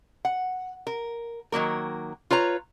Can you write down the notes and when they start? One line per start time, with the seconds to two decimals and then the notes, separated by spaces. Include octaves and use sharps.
0.25 F#5
0.87 A#4
1.52 D#3 F#3 A#3 A#4
2.31 F4 B4 C#5 A#5